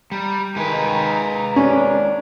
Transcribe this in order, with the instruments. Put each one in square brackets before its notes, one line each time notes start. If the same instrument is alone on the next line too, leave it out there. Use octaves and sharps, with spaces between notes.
[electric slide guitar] G3 [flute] A#5
[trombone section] D#3 [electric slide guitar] G#3 B4
[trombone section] D#3 D4 [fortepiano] C#4